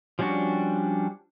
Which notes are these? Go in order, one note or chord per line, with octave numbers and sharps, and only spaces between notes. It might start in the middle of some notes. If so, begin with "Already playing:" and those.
F3 G3 C#4 D4 F#4